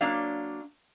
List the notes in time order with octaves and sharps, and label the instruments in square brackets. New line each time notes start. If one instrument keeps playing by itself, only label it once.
[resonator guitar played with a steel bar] F#3 A#3 D4 F5